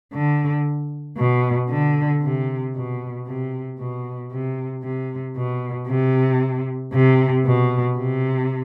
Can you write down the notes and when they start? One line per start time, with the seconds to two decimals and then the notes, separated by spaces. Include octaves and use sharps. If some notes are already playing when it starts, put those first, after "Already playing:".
0.13 D3
1.17 B2
1.69 D3
2.22 C3
2.74 B2
3.26 C3
3.78 B2
4.31 C3
4.83 C3
5.36 B2
5.87 C3
6.93 C3
7.45 B2
7.97 C3